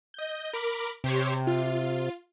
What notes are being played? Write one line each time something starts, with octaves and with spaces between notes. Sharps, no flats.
D#5 G6
A#4 B5 D6
C3 G4 C5 C#5
F4